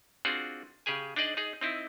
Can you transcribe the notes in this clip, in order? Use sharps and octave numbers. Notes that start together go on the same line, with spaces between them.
C4 D4 F4 F#4 G#4
C#3 G4 G#4 G#5
D4 D#4 G#4 D5 D#5
D#4 G#4
C4 D#4 E4